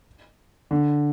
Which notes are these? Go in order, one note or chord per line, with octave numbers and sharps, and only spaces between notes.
D3